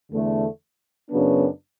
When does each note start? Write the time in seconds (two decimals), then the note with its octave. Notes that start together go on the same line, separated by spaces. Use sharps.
0.10 E2 D3 A3
1.10 F#2 C#3 F#3 B3 D4